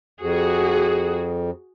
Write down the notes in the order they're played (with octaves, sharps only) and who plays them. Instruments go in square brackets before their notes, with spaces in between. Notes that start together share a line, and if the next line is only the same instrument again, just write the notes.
[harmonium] F2 [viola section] F#4 G#4